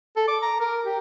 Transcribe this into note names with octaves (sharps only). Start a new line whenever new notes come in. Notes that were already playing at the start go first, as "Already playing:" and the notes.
A4
D6
A#5
A#4
G4